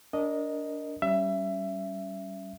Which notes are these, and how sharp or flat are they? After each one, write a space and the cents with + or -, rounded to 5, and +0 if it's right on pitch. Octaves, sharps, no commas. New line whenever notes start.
D4 -25 A#4 +0 D#5 +0
G3 -25 C#4 +0 E5 +20